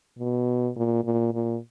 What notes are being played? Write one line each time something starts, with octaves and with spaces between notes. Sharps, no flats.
B2
A#2
A#2
A#2